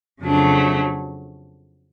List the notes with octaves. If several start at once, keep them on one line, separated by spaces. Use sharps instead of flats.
F2 C#3 F#3 A3 D4